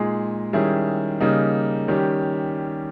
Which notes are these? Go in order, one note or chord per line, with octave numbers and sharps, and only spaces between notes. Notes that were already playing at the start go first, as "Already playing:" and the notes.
Already playing: A#2 G#3 D#4 G#4
D#3 G3 C#4 E4 G#4
C#3 G3 A#3 D#4
D#3 G3 C#4 G4